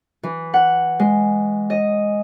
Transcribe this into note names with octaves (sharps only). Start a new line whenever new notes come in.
E3
F#5
G#3
D#5